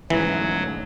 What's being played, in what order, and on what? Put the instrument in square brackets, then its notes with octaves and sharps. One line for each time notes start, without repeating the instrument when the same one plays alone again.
[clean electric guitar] D2 G#2 C#4 [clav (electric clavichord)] E3 [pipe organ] F#3